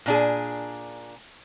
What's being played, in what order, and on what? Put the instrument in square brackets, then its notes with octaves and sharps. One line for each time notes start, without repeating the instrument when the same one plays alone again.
[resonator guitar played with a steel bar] A#2 D4 G#4